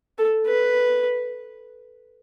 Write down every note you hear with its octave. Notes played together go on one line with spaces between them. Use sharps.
A4
B4